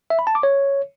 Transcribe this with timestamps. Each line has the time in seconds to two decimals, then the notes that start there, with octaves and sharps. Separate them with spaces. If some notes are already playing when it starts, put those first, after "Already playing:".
0.10 E5
0.19 B5
0.27 A5
0.35 D6
0.43 C#5